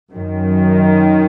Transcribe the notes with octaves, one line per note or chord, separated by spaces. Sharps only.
F#2 D#3